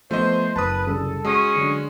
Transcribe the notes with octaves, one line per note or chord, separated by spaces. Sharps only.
F3 A3 B3 C5 D#5
F#1 B4 A5 D#6
C2 F#2 C#3 A4
G#3 C#4 F#4 C#6 D#6
D3 F#3